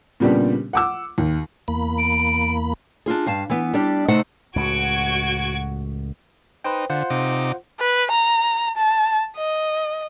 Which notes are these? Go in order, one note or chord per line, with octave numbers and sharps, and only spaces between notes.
A#2 C#3 G3 B3 D4 G4
F#5 D6 E6
D#2
E2 A#3 B5
D7
D4 D#4 F4 G#4
G2 F5 A5
E3 B3
G3 D4 G4 D5
C3 A3 D#4 C5 F#5
C#2 A2 F#4 G#6 D7
D#4 B4 C5 G5
D3 F4 C5 F#5
C3 D#4 D6
B4
A#5
A5
D#5